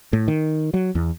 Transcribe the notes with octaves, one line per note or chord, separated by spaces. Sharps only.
A2
D#3
F#3
E2